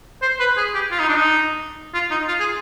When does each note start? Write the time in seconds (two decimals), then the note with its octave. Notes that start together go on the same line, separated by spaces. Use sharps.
0.22 C5
0.40 B4
0.57 G#4
0.74 G4
0.91 F4
0.99 D#4
1.08 D4
1.17 D#4
1.94 F4
2.11 D#4
2.28 F4
2.40 G#4